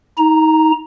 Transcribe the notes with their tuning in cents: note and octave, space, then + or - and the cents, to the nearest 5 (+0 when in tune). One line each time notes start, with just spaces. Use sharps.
D#4 +30 A#5 +0